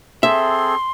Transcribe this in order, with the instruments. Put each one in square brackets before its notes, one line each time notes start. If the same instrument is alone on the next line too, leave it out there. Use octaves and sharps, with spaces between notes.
[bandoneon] C4 G#4 A4 [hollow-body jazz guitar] E5 [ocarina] C6